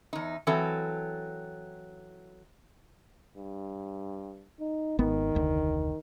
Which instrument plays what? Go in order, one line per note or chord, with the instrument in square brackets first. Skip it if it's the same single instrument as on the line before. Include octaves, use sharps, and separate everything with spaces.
[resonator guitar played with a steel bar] E2 D#4
E3 F#3 C4 A4
[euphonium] G2
D#4
[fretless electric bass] G#1 B3 [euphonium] D#3
[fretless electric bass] F1 D2